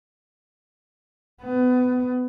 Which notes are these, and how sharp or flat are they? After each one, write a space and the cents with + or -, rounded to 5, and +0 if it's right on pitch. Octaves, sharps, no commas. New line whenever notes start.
B3 +25